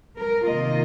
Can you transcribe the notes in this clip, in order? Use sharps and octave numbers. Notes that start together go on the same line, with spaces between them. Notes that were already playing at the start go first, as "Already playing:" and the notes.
A#4
C3 D#3 A#3 F4 D#5